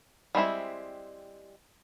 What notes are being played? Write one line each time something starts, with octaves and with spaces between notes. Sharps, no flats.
G3 G#3 C4 E4